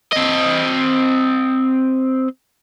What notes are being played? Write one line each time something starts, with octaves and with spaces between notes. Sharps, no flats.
C4 D#5